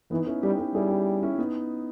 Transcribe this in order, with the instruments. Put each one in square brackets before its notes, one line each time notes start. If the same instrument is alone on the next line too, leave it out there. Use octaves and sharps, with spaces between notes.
[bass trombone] E3 [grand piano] B3 D#4
[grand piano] C#4 E4
[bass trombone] G3 [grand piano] D#4 G4
[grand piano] D#4 G4
[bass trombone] G3 [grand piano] E4 G#4
[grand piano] E4 G#4
C#4 E4
B3 D#4